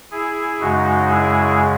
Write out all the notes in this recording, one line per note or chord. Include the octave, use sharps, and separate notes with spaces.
E4 G#4
F#2 C#3 G#3 D#4 F#4
E4 G#4